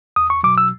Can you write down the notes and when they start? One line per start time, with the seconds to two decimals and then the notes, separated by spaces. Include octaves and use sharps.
0.16 E2 D#6
0.30 C#6
0.43 B2 F#3 D6
0.58 E6